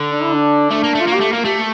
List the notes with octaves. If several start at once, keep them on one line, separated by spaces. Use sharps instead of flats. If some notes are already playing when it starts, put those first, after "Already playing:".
Already playing: D3
D4
E4
D4
A3 D4
A#3
A3
F4
A#3
G4
A3
A#3
A3 G4